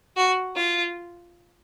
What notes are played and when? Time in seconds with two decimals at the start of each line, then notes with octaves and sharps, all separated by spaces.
0.17 F#4
0.56 F4